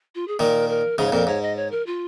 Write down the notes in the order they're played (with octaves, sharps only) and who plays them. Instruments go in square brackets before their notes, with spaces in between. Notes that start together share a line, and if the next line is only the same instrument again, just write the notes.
[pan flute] F4
G#4
[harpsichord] A#2 D#3 [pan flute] A#4
[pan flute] A#4
[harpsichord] G#2 C#3 [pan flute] G#4
[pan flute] C#5
[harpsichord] F2 A#2 [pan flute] A#4
[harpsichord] G#2 [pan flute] C#5
[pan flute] D#5
C#5
A#4
F4